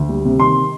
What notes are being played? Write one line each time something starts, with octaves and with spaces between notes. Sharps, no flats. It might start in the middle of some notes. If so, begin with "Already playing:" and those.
Already playing: D2
G3
C3
D#3 C6